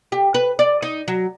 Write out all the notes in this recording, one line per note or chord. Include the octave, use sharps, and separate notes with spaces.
G4
B4
D5
D#4
F#3